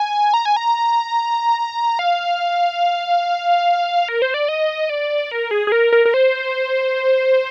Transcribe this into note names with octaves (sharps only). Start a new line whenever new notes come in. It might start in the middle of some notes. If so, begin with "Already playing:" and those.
Already playing: G#5
A#5
G#5
A#5
F5
A#4
C5
D5
D#5
D5
A#4
G#4
G#4
A#4
A#4
A#4
C5